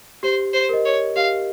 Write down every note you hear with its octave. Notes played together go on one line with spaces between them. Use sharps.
G4 C5
C5
A#4 D#5
C#5
G4 F5